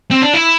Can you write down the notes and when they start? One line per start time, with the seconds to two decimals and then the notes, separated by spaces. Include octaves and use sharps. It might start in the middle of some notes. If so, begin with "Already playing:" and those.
0.11 C4
0.22 D4
0.34 E4